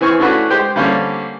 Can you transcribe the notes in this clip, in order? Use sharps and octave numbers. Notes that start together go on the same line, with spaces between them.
E3 C4 G#5 C#6 F6
A3 C#4 D4 E4 F#4 B4
G#3 G4 C5 G5
D3 G3 A#3 C4 C#4